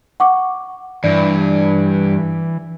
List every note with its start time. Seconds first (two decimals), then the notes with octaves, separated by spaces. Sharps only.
0.20 F#5 C#6 D6
1.04 G2 E3 D5